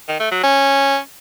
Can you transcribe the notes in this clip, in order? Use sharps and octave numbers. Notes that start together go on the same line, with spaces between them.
D#3
A3
F#3
C#4